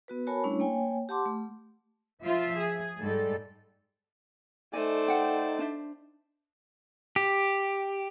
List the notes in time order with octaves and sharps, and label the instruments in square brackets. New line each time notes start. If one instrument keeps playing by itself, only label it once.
[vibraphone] B3 F#4 B4
F#4 A#4 C#5 G#5 A5 B5
G3 A3 C#4 D4 E4 C#5
A#3 C#5 G5 G#5
G4 F#5 A5 C6 D6
A3
[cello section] F3 F4 E5
G#4
G#2 G3 A4
[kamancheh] A3 C5 [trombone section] D#4 [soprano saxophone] D5 [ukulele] G#5
[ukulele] F#5 G5
D4 C5 E5
[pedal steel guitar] G4